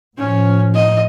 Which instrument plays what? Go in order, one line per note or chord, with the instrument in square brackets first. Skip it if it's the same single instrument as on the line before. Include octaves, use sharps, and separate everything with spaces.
[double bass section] A2 F3 [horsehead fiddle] C#4
[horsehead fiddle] D#5